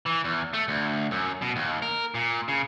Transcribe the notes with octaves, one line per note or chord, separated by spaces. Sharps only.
E3
E2
A3
D2
F#2
B2
D#2
A#4
A#2
C#3